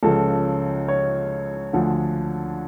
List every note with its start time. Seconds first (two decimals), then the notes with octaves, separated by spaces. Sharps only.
0.03 C#2 C#3 F3 A4
0.88 C#5
1.73 D2 D3 F3